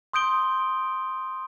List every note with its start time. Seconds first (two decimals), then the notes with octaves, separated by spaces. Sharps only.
0.13 C6 D#6 G6 D7 G7